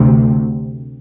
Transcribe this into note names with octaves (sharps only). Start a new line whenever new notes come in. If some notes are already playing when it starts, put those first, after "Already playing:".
Already playing: D2 C3